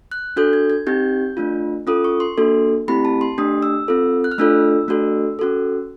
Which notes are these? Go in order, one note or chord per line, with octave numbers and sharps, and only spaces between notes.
F#6
D4 F#4 A4 G6
G#6
G#6
C4 D#4 G4 G6
A3 D4 F4
C#4 F4 A4 D#6
C#6
C6
A#3 D4 F#4 A4
A3 C4 E4 G4 B5
A5
C6
A3 D4 G4 D#6
E6
C4 F4 A4
F#6
F6
A3 D4 F4 A4 E6
A3 D4 F#4 A4
C#4 F#4 A4